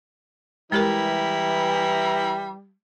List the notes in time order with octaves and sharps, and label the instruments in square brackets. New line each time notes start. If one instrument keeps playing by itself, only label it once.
[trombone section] E3 [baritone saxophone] G3 [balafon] G#3 G4 A#4 [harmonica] E4 A#5